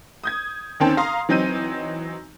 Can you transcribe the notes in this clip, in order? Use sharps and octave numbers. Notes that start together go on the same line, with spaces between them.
D#6 G6 G#6
D#2 D#3 C4 C#4 G5 A5
F5 A#5 C6 D#6
E3 F#3 C4 D#4 G6 D#7